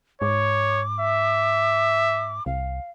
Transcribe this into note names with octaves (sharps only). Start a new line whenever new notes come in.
G#2 C#5 D6
E5
C2 F5